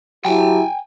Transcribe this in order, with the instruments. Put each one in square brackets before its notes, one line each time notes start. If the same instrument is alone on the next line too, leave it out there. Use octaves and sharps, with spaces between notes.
[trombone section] F#3 E4 G4 [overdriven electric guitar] G5 G#5